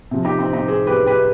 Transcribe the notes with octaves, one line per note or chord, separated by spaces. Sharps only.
C3 F3
D#4 G4
C4 D#4
C4 D#4
G#4 C5
G4 B4
G4 B4